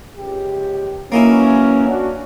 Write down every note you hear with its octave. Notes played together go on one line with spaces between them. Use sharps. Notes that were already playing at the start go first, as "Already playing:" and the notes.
C#2 G4
E3 F#3 A#3 C#4 D#4 E4
D4 F#4